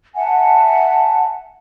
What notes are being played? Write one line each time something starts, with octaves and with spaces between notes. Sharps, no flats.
E5 F#5 G#5 A5